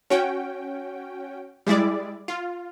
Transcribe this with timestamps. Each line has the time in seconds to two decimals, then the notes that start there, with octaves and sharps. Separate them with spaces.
0.10 C#4 F#4 G5
1.67 G3 G#3 E4 D5
2.28 F4